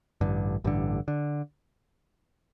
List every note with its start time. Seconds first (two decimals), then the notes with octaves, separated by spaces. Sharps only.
0.21 A1 G2 D3
0.64 A1 G2 D3
1.08 D3